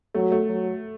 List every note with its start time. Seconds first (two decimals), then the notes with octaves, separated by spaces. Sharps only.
0.14 F#3 A3
0.32 A3
0.49 F#3